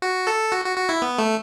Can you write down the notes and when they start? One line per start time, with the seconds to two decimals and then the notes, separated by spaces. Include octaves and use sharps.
0.02 F#4
0.27 A4
0.52 F#4
0.65 F#4
0.77 F#4
0.89 E4
1.02 B3
1.18 A3